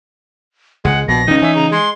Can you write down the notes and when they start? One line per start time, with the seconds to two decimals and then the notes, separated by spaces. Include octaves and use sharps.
0.85 C#2 G#3 F#5
1.08 A#1 B2 A#6
1.28 C#2 D#3 C#4 D#4
1.42 E3 C#4 E5
1.55 C#3 A#5
1.72 G#3 C6